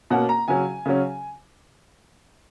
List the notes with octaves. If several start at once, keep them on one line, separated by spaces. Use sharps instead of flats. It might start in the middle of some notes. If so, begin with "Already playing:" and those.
B2 A#3 C#4 F#5
A#5
C#3 F#3 C#4 G#5
C#3 F#3 C#4